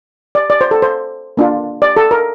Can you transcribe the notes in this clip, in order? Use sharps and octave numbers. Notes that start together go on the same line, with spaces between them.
D5
D5
C5
A4
C5
A#3 D4 F4
D5
A4
A#4